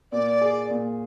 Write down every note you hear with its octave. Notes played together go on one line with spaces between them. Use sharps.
A#2 D5
G#4
A#2